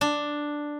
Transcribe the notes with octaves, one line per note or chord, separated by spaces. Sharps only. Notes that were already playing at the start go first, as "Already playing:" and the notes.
D4